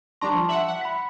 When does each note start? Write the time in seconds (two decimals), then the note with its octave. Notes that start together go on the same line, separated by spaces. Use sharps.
0.21 G3 D4 A5 A#5 C6 C#6
0.33 F3
0.49 E5 F#5 F#7
0.67 F#5
0.81 B5 B6